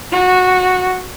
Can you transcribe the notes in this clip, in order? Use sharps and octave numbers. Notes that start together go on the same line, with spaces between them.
F#4